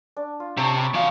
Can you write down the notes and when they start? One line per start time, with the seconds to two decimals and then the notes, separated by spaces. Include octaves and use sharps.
0.17 D4
0.40 F4
0.57 C3 C#5 A5 C#6
0.78 B5
0.94 E3 F3 F4 F#4 F5